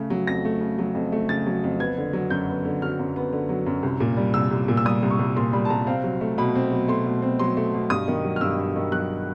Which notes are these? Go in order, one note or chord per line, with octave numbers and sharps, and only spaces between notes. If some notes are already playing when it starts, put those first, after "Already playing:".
Already playing: C#3 A3
F#3
F2 A#6
A3
C#3
F#3
F2
A3
C#3 A6
F#3
F2
B3 G#6
D3
F#3
F#2 G6
B3
D3
F#3 F6
F#2
B3
D3
F#3
F#2
C2
A#2
G3
C2 E6
C2
A#2
E6
G3 D#6
C2
C#6
C2
A#2 C6
G3 B5
A5
C2 A#5
C4 F5
F#3
A3
B2 B5
C4
F#3
A3 C6
B2
C4
F#3 C6
A3
B2
G2 D#6
D#3
F#3
F6
G2 E6
G2
D#3
F#3 F#6